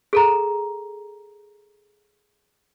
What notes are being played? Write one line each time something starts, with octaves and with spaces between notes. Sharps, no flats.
G#4 A4 A#5